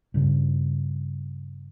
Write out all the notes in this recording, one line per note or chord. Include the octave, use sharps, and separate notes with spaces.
G2 C#3